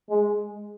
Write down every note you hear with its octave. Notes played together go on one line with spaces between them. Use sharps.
G#3